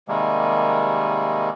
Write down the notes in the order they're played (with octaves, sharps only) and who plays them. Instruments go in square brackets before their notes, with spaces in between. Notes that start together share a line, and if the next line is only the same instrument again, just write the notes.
[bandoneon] C3 D#3 G3 G#3 A#3